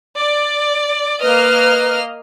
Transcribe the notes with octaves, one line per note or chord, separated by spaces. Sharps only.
D5
A#3 B4 D#5 F6